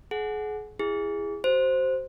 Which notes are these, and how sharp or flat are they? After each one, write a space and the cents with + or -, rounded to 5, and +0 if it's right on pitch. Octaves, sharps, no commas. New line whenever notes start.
G#4 +35 F#5 +0
E4 +10 G#4 -20
F#4 +40 C5 +0